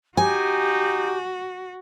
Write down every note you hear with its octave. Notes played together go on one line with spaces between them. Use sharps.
D#4 F#4 G4 G#5